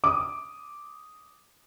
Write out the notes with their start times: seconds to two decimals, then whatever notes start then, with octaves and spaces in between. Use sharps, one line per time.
0.04 D6 D#6